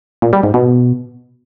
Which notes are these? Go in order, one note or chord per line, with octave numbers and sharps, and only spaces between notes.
A#2
G3
G#2
B2